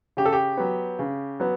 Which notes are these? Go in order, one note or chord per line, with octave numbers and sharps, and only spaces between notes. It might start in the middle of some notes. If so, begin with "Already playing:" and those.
C#3 G4
A4
G4
F#3 B3
C#3
F#3 B3